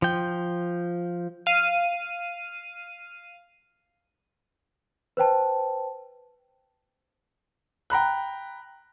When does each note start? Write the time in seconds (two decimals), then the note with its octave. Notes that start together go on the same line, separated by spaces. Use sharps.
0.02 F3 G5
1.46 F5 D#7
5.17 B4 C5 G5 A5
7.90 G5 A#5 B5 F#6